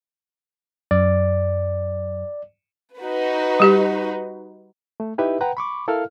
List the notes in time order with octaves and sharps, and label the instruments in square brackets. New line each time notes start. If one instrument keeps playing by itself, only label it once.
[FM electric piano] F#2 [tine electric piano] D5
[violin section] D#4 F#4 B4
[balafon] G3 G4 D#5
[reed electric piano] A3
D#4 E4 G4 B4 E5
B4 F#5 G5 A#5
B5 C#6 D6
E4 A4 A#4 F5 F6